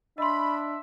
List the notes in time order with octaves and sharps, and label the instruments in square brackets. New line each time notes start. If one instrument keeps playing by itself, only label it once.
[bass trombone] D4 [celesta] D#5 C6 [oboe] E5 [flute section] B5